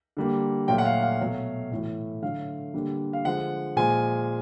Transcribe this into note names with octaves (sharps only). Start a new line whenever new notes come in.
D3 G3 A#3
A#2 F#3 A3 G5
F#5
F5
F5
B2 F#3 A3
A2 E3 A3
D3 F#3 A3 F5
D3 G3 A#3
F5
D3 F3 G#3 F#5
A#2 F3 G#3 G#5